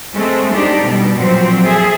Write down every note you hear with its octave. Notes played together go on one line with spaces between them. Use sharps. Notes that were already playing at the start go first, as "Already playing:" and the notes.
G#3 A3 C4
D4 D#4 G4
B2 G3
A#2 F3 F#3 C4
G#4 A4 E5